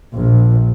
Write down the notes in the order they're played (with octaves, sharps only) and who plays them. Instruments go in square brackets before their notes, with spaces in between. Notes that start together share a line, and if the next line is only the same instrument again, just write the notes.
[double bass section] A#1